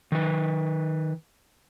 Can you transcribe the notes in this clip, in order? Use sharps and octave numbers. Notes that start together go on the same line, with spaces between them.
D#3 B4